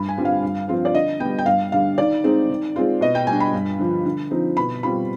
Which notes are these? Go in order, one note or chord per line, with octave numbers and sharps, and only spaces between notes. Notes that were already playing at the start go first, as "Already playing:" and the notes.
Already playing: G2 B5
G#5
D3 G3 C4 F4
F5
G2
F3 C4 F4
D5
D3 D#5
G3 B3 G5
G5
G2 F5
D3 G3 F5
D#3 D5
G#3 C4 D#4
D#3
G#3 C4 F4
B2 D#5
G5
G3 D4 G#5
B5
G2
D3 F3
D3
F3 C4 D#4
B2 B5
G3 C4 F4 B5